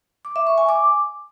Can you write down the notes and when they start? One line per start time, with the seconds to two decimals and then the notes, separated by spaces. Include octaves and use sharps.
0.25 D6
0.36 E5
0.47 C#6
0.58 G#5
0.69 D6